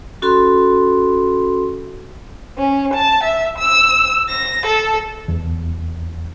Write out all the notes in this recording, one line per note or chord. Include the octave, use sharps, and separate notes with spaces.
C#4 F#4 A4 B5 C6
C#4
A5
E5
E6
A#6
A4
E2